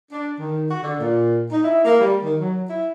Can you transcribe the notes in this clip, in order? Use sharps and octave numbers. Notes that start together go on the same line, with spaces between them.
D4
D#3
F#4
D3
A#2
D#4
E4
A#3
G3
D#3
F#3
E4